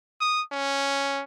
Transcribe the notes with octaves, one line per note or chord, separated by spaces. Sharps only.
D#6
C#4